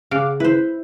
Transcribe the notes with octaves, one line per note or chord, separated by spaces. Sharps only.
C#3 F5 F#5 D6
E4 B4 C5